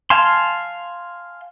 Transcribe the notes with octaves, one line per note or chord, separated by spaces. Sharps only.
F5 G#5 A5 C6